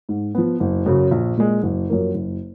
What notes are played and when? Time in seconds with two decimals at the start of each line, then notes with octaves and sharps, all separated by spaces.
0.09 G#2
0.35 F3 B3
0.60 F#1
0.86 F#2 C#3 F#3
1.11 A#1
1.38 A#2 G#3
1.63 F#1
1.90 F#2 F3 A#3
2.14 F#1